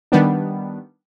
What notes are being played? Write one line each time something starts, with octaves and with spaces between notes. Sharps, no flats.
D#3 G3 B3 D4